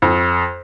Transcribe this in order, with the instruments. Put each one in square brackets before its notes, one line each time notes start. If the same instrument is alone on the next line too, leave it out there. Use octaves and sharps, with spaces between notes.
[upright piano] F2